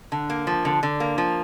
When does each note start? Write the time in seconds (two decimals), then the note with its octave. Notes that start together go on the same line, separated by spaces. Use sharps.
0.12 D3
0.30 A#3
0.47 F3
0.65 D3
0.83 D3
1.00 A#3
1.18 F3